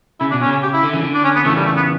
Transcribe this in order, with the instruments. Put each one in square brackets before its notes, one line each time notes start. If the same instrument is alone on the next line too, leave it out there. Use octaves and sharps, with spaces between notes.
[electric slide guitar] C#3 [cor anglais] E4
[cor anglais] D4
[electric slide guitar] B2
[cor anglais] C#4
[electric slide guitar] C#3
[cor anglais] C#4
G4
E4
[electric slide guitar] D3
C#3 E3
D3
[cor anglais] D4
C#4
B3
[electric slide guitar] C#3 E3 [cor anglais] A3
[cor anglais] G3
A3
B3